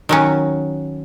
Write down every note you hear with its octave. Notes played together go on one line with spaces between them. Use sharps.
D#3 F#3 C#4